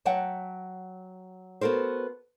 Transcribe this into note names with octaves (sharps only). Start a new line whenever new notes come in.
F#3 E5 F#5 G5 A5
B3 F#4 A4 A#4 C5